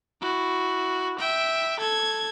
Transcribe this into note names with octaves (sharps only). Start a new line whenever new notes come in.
E4 F#4
E5 G5
A4 G#6